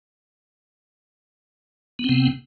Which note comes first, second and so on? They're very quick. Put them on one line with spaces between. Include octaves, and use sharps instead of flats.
B3 C4 C3